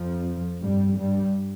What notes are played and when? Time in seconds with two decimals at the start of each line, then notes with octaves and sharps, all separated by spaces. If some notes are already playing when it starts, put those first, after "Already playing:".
Already playing: F2 F3
0.62 G2 G3
0.97 G2 G3